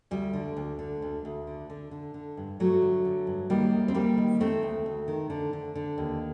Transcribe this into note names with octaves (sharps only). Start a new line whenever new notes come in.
D2 G3
D3
D2
D3
D2
D2
D3
D3
D3
D3
G2
G2 F#3 A3
D3
D3
G2
D#3 G3 A#3
D2
C4
D2 G3 A#3
D#3
D#3 A3 C4
D2
D2
D#3
D3
D3
D3
D#2